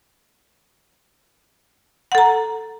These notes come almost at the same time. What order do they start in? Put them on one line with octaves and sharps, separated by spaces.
F#5 A4 A#5